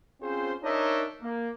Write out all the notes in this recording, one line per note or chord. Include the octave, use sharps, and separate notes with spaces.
C4 C#4 F4 G#4 C5
D4 D#4 A#4 C#5 D#5 E5
A#3